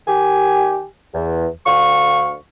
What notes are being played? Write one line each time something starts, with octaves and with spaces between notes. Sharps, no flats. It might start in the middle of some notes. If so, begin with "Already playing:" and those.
D#3 G4 G#5
E2
D2 D3 F5 C#6